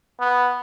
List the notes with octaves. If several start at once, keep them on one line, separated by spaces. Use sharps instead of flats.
B3